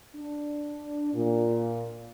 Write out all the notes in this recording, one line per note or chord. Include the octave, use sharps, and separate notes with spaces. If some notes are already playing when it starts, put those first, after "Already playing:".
D4
A#2